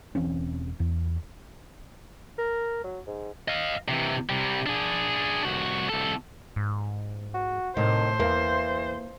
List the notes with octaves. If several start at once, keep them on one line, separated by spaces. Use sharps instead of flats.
E1 E3 C4 C#4
E2
A#4
F#3
G#2
D#5 F5
C3 E3
C3 G3
D4 G#4
C2 F#4
C2 A4
G#2
F#4
A2 C3 D#3 C5
E2 E3 A#3